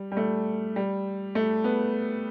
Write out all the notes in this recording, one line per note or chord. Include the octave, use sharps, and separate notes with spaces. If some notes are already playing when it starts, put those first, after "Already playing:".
Already playing: G3
G3
A3
G3
A3
B3